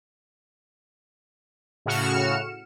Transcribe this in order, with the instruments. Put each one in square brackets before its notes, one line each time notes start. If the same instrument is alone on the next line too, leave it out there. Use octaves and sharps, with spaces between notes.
[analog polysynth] A2 C#3 F#4 F6 C#7 E7